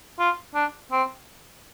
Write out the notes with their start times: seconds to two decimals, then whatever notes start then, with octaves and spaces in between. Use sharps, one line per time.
0.19 F4
0.55 D4
0.92 C4